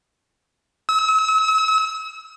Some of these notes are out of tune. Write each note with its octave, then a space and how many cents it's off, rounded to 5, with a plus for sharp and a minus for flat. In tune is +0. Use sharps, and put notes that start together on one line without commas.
E6 -40